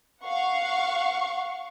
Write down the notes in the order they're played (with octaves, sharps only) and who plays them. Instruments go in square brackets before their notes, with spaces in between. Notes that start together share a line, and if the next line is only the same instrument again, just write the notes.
[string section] F5 F#5 C#6